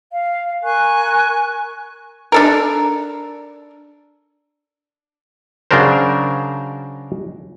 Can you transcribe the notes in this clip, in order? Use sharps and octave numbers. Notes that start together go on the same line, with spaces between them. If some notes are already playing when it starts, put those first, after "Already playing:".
F5
A#4 G#5 C#6 F#6
D4 A4 A#4
C#3 F#3 D4 A#4 C5